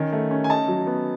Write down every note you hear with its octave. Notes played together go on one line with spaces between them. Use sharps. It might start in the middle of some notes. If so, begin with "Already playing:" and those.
Already playing: D#3 C#4
A3
C#4
G#5
D#4 A5
F#3
B3